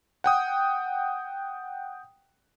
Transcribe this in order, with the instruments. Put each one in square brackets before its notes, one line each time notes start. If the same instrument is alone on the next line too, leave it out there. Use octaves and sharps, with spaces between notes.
[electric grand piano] F#5 G5 D#6